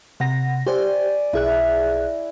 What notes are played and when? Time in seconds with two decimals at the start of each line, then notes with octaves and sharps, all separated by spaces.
0.20 C3 F#5 A#5 A#6
0.66 G4 C5 D5 G#5 C#6
1.33 B1 E4 G#4 F#6